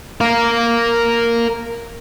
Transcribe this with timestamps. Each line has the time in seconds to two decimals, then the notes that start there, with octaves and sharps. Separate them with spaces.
0.21 A#4 F5